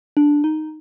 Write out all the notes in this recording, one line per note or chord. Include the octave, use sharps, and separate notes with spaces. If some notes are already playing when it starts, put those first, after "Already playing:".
D4
D#4